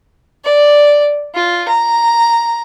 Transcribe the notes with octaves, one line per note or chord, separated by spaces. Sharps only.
D5
F4
A#5